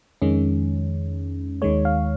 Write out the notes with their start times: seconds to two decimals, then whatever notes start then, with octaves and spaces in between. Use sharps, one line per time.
0.22 F2 D#3 G#3 C#4
1.62 D#2 D#3 G#3 C#5
1.85 F5